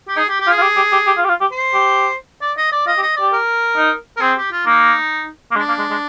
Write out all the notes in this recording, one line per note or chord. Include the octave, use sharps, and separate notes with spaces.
G4
D#4 G#4
G4
G4
F4
G#4
F4
G4
G4
G4
G4
F4
G4
F4
G4
C5
G4
D5
D#5
D5
F4 D#5
G4
D#5
G4 D5
A#4
D#4
A#4
C4 G#4
G4
F4
A#3 D#4
A#3
G#3 D4
A#3
G#3
G#3